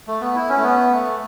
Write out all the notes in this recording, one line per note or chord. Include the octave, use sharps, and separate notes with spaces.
A3
B3
E4
C#4
A3
B3
A3